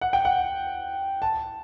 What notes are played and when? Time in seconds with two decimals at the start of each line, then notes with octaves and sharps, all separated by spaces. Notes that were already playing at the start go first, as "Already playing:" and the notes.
0.01 F#5
0.13 G5
0.25 F#5
1.22 A5